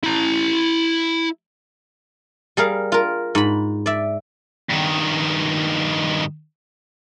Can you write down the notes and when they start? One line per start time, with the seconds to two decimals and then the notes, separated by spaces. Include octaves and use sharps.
0.04 E4 A#5
2.57 G3 G#4 A#4 F5
2.92 F4 A#4
3.35 G#2 B5
3.86 D5 E5
4.70 G2 D#3